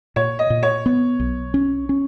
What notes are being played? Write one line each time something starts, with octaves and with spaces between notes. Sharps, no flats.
A#2 C#5
D#5
A#2
C#5
B3
B1
C#4
C#4